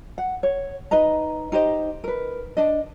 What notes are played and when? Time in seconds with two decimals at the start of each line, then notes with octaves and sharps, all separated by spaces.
0.18 F#5
0.43 C#5
0.91 D#4 B4 D#5 A#5
1.52 D#4 G4 C5 D#5
2.04 A#4 B4
2.57 D4 D#5